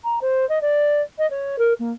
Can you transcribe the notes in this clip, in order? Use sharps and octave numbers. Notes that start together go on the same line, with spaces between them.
A#5
C5
D#5
D5
D#5
C#5
A#4
A#3